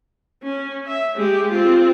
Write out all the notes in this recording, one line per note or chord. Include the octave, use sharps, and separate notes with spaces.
C#4
E5
G#3 G4
C4 F4